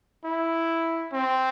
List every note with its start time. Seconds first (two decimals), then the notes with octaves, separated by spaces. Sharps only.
0.24 E4
1.13 C4